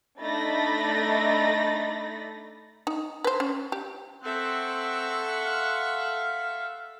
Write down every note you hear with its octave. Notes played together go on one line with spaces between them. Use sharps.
A3 D4 D#4 B5 A6 A#6
D#4
B4 C5
C#4
G4
C4 A4 E5 F#5 C6 C#6
F5